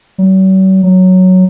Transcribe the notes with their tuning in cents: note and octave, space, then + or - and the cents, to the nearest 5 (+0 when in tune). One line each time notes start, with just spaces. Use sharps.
F#3 +45
F#3 +0